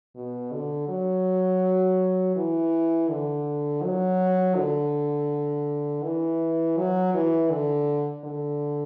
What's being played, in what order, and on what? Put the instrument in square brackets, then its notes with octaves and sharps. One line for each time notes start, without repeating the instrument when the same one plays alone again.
[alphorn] B2
D3
F#3
E3
D3
F#3
D3
E3
F#3
E3
D3
D3